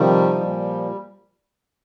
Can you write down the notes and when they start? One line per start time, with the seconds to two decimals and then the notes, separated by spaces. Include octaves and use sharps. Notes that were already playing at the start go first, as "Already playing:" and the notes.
Already playing: C3 D#3 F3 G3
0.40 A#2